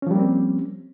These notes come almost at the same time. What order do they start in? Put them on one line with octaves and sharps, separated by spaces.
C#4 F3 G3 A#3 C4